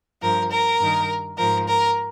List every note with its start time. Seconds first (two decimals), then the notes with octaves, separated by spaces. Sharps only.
0.22 G2 F3 A#4
0.51 A#4
0.80 G2 D#3
1.37 G#2 F3 A#4
1.67 A#4